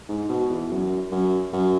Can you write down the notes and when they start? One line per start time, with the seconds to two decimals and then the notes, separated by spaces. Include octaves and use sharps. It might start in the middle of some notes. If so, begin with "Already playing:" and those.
0.08 G#2
0.29 B2
0.50 E2
0.70 F#2
1.12 F#2
1.53 F#2